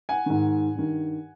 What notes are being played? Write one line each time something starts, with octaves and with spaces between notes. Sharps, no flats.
F#5 G#5
G#2 D#3
G2 D#3